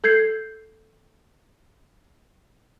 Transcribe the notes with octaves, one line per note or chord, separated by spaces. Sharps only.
A4 G6 G#6 C7